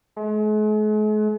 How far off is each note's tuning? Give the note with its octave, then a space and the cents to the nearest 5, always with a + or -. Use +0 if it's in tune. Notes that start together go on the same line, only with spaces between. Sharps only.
G#3 +45